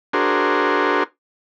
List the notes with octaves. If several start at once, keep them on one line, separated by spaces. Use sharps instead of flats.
D4 F#4 G#4 A#4 C5